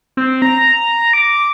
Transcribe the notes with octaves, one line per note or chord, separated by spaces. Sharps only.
C4
A#5
D6